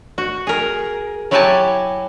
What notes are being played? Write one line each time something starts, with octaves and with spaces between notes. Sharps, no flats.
F#4
G#4 A#4
F#3 E4 F#4 G4 G#5 A5